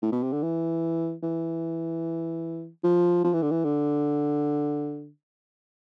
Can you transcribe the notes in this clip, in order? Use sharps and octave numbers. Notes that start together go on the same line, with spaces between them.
A2
B2
C3
D3
E3
E3
F3
F3
E3
D3
E3
D3